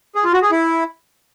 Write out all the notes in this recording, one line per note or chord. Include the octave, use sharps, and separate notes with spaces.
G#4
F4
F#4
G#4
E4